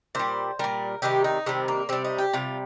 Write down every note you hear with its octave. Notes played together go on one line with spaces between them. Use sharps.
A#2 G3 C5
A#2 G3 A#4
C3 D#3 G3 G4
D#4
C3 D#3 G3 C4
A#3
C3 G3 C4
D#4
G4
C3 G3 F4